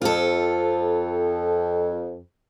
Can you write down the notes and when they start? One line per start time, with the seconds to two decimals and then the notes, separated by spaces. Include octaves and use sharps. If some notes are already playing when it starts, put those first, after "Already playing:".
0.02 F2 F4 A4